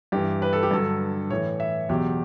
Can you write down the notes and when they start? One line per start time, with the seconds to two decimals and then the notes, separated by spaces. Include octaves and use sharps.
0.12 G2 G4
0.16 E3
0.42 B4
0.53 A4
0.63 G4
0.71 G2 D3 F#3 A4
1.30 A2 E3 C#5
1.60 E5
1.89 E2 B2 F#3 G4